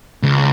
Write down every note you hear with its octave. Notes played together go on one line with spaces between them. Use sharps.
C#2